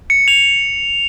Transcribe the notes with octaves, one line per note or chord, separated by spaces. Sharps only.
C#7
F7